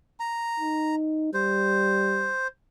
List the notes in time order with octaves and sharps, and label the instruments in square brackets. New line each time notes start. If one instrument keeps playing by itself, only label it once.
[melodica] A#5
[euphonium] D#4
[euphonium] G3 [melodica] C5